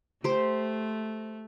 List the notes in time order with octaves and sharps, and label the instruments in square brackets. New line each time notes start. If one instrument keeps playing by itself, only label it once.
[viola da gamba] A3 [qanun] G4 C5